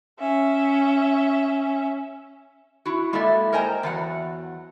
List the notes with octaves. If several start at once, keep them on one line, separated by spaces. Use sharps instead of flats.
C#4 E5
E4 F#4
G#3 A#3 E4 A4 D5 E5
A#4 C5 D#5 G5 G#5 A#5
E2 F#3 F#5